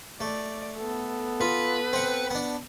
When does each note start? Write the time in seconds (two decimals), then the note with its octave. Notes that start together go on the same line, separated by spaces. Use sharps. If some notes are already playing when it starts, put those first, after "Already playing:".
0.20 A3 D5
0.78 B3 A4
1.41 F4 B4
1.93 C4 F#5
2.31 B3 D4